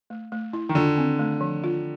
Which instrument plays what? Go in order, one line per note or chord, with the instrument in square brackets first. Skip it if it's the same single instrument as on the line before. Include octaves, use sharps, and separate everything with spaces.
[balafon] A3
A3
E4
[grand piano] D#3
[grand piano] D3 [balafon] F4
[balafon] C4
A3
F3
F4